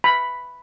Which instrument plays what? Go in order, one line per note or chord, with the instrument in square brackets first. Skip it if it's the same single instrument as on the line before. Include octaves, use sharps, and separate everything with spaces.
[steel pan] B5